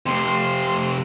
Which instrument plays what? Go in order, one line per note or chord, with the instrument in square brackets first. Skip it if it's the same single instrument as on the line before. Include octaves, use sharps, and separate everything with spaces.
[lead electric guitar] F2 C3 [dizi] C6